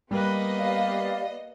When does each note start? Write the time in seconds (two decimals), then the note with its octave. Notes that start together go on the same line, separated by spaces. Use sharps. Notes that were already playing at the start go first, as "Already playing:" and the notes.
0.11 G3 A#3 B3 B4 D#5
0.57 G4 D5 F5